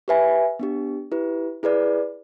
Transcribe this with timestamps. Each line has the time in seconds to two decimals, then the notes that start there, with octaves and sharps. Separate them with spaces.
0.08 G4 B4 E5 G#5
0.59 B3 D4 G4
1.12 E4 G4 B4
1.63 E4 G#4 B4 D5